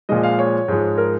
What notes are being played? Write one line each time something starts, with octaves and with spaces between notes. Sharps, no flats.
A#2 F3 G#3 D#5
F5
C#5
G#2 F3 G#3
A#4